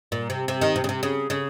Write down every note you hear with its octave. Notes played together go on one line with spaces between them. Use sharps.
A#2
C3
C3
D#3
C3
C#3
C3
C#3
C#3